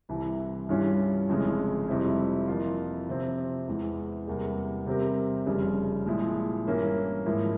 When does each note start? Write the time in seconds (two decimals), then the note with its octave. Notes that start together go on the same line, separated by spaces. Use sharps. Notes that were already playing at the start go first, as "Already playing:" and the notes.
0.09 C2 C3 E3
0.69 G2 E3 G3 C#4 F4
1.29 F1 F2 C#3 E3 G#3
1.88 F2 C3 G3 C4 E4
2.47 F2 E3 A#3 F4
3.08 C3 F3 C4
3.68 E2 E3 G#3
4.27 E2 C3 G3 A#3
4.86 C3 G3 C4 G4 A#4
5.46 F1 F2 C#3 G3
6.06 A#2 F3 G#3 E4
6.67 G2 E3 A#3 C#4
7.26 G#2 F3 A#3 E4